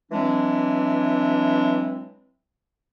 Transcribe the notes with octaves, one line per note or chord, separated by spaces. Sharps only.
E3 F#3 G#3 C4 D4